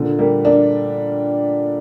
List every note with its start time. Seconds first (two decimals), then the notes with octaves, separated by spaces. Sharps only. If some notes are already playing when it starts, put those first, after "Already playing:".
Already playing: A#2 D3
0.19 G3 A#3
0.45 A#3 D4